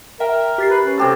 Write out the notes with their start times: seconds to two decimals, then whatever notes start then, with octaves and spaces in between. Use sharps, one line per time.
0.20 A#4 E5 G5
0.58 G4 A6 C7
0.70 B4
0.84 C#4
0.98 C3 G4 A4